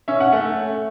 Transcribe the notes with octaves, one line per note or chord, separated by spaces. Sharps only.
C#4 E5
F#5
A3 F#5